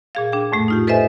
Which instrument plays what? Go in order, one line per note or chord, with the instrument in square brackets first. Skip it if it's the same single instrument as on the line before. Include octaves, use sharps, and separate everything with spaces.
[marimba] A#2 G#4 F5
D4 G#4 G5
F2 A2 A3
D#4 F4 G4
A4 B4 C5 D#5 E5 G#5